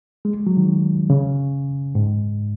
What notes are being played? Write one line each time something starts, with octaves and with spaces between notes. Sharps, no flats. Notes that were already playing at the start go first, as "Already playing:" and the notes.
G#3
F#3
D#3
C#3
G#2